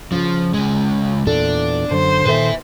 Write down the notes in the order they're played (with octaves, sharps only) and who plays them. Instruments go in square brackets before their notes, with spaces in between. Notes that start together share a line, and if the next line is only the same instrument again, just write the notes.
[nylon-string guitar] C#3 C#4 [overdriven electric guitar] F3
[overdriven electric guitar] C#2 G#3
[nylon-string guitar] E2 A#2 A4 [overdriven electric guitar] D4
[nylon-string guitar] F#2 D3 A5 [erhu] C5
[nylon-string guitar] A#2 D#3 A4 [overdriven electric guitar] B4 E5